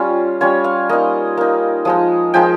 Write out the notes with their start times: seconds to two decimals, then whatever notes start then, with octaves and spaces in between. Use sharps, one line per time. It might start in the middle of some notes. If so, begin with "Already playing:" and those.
Already playing: G3 C#4 F4
0.41 G3 C#4 F4 C#5
0.64 F5
0.89 A#3 D#4 D#5
1.37 A#3 D#4
1.85 F3 G#3 D#4 D#5
2.34 F3 G#3 D#4 G5